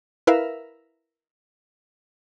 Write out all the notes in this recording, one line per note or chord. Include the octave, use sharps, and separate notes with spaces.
E4 A#4 B4 E5 F5